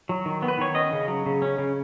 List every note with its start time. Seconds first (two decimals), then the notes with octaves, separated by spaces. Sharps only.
0.09 F#3
0.25 D#3
0.42 B3
0.48 B4
0.58 D#3 C#5
0.75 C#4 D#5
0.93 C#3
1.08 F#3
1.26 C#3
1.42 C#4
1.58 C#3